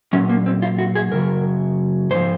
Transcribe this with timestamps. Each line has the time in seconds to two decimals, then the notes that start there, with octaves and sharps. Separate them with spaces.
0.13 A#2 F#3 C#4
0.29 A#3
0.46 C4
0.62 F4
0.78 F#4
0.95 G#4
1.12 F#2 C#3 F#3 A#4
2.10 G#2 F3 C5